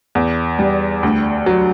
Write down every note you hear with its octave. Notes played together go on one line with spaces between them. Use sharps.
E2
G3
D2
F#3